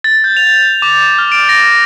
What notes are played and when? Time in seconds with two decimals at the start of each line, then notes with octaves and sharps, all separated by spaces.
0.04 A6
0.24 G6
0.37 F7
0.82 D6
1.19 F6
1.32 D7
1.49 A#6